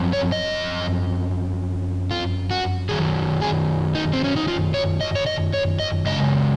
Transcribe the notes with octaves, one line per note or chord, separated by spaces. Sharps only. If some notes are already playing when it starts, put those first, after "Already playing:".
Already playing: F#2 F3 C4
C#5
D#5
F4
F#4
F#2 D#3 F#3 G#4
G#4
D#4
C4
C#4
D#4
F4
C#5
D#5
C#5
D#5
C#5
D#5
F#2 C#3 G#3 D#5